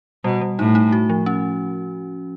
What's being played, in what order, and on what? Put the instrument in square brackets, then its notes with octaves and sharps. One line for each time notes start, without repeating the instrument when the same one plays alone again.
[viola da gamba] B2 [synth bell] G3
[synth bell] G3
[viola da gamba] A2 [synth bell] D#4
[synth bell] D#4
F#4
F3
C#4